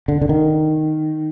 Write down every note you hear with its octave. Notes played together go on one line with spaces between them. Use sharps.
D3
D3
D#3